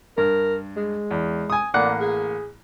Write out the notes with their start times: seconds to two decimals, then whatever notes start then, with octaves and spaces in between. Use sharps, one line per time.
0.18 G2 A#4
0.77 G#3
1.11 E2
1.50 G#5 D#6
1.74 A1 A#3 D5 F#5
2.01 G#4